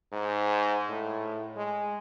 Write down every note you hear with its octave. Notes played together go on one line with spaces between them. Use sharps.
G#2
A2
G#3